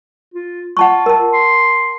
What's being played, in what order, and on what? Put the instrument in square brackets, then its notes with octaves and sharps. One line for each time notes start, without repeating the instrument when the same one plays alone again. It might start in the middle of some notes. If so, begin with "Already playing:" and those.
[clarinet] F4
[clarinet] F4 [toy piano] F#5 A5 C#6
[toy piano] A#4 A5
[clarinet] C6